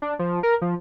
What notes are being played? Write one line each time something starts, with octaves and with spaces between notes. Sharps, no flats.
D4
F3
A#4
F3